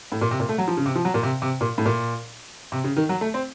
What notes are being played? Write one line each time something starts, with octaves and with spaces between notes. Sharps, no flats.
A2
A#2
C3
A#2
A3
F#3
F3
C#3
C3
F3
F#3
A#2
C3
C3
A#2
A2
A#2
C3
C#3
D#3
F#3
A3
C4